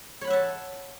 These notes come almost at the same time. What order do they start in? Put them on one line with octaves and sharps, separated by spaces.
C#5 B5 F#5 E5 A5